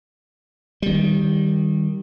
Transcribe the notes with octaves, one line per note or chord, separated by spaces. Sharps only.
D#3 G3